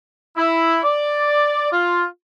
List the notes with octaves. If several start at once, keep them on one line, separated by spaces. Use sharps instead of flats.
E4
D5
F4